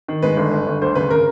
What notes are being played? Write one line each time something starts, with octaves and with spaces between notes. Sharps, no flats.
D#3
G#3 B4
G1
G1
G1
D2 C5
C#3 B4
C#3 A#4